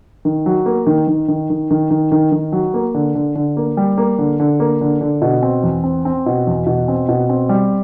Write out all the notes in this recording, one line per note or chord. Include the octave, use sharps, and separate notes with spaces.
D#3
F#3
A#3
D#3
D#3
D#3
D#3
D#3
D#3
D#3
D#3
F#3
A#3
D3
D3
D3
A#3
G3
A#3
D3
D3
A#3
D3
D3
B2
C4
E2
C4
C4
B2
E2
B2
C4
B2
C4
G3